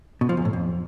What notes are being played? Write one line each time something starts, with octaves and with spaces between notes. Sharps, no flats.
B2
F3
E2
A2
F2